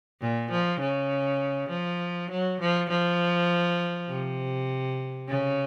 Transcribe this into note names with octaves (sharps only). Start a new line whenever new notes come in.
A#2
F3
C#3
F3
F#3
F3
F3
C3
C#3